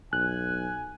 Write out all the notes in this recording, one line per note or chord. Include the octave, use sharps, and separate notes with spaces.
B1 G#5 F#6